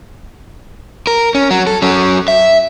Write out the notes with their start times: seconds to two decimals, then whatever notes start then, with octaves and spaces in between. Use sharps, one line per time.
1.07 A#4
1.35 C#4
1.50 F#3
1.67 A4
1.82 F#3 C#4
2.28 E5